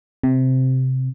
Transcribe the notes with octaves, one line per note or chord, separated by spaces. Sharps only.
C3